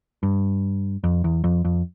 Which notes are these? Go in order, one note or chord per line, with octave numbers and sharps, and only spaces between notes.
G2
F2
E2
F2
F2